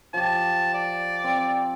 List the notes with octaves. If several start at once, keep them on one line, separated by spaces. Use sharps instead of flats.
F3 G4 A5
D5
C4